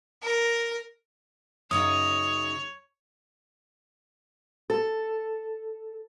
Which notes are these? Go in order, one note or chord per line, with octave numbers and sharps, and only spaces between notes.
A#4
F#2 C#3 D#4 C#5 D#6
A4